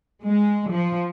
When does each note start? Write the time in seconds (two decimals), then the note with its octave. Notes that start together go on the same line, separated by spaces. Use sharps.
0.23 G#3
0.71 F3